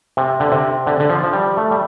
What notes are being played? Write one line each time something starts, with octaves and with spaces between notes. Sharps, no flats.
C3
D3
C3
D3
D3
F3
F3
G3
A3
G3